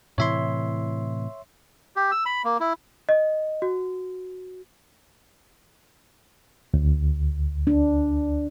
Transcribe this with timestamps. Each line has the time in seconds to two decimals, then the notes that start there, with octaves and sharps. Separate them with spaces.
0.18 A2 C3 E3 C#5 E5 C6
1.96 G4
2.11 E6
2.26 B5
2.44 A#3
2.60 E4
3.09 D#5
3.62 F#4
6.74 D2
7.67 D4